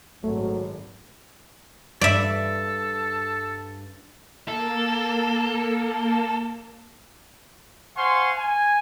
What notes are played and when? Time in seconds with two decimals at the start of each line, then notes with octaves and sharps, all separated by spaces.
0.24 G#1 F#3 A3
2.01 G2 A4 D5 E5
4.48 A#3 A4
7.96 C5 F5 F#5 G#5 C6 C#6
8.37 G#5